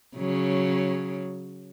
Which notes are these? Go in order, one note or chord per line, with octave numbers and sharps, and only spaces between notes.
C#3 F#3